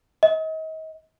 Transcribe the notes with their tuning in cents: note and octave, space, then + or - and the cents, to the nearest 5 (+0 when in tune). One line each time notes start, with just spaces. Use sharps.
D#5 +35